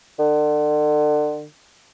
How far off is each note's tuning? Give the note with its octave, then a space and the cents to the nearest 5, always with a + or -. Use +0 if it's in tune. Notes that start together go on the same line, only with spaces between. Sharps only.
D3 +35